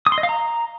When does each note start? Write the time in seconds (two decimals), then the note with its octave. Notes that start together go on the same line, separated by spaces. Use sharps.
0.06 D#6
0.12 C6
0.18 D#5
0.23 F5
0.29 A#5